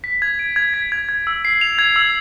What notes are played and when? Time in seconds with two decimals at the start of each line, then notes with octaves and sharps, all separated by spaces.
0.04 B6
0.22 G#6
0.39 D7
0.56 G#6
0.74 B6
0.92 G#6
1.09 G#6
1.27 E6
1.45 C7
1.61 F7
1.79 G#6
1.96 E6